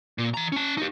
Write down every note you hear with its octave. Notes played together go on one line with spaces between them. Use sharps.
A#2
E3 A#5
C#4 A5
D#4 G4